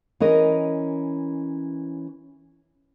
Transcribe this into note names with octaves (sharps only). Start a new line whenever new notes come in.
E3 C#4 A#4 D#5